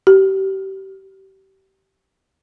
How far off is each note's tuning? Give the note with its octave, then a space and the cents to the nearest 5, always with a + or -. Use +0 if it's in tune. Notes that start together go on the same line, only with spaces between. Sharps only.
G4 -30